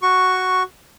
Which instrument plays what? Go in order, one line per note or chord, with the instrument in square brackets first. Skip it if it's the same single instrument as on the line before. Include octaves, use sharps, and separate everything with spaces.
[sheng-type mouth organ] F#4 C#6